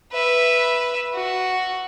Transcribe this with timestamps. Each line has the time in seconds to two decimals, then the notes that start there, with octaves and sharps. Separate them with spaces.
0.12 B4 E5
1.14 F#4